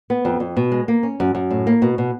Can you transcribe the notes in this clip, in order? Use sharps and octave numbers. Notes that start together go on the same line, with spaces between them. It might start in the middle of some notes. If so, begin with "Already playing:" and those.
B3
F2
F2
B2
G#3
A#3
C#4
F#2
F#2
A2
A#3
B2
B2